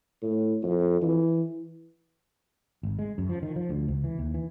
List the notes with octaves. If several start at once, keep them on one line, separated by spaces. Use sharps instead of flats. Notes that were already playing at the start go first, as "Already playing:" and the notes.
A2
F2
E3
G#1
G#3
F#2
F3
D#3
F3
D2
C#2
E3
D#2
E3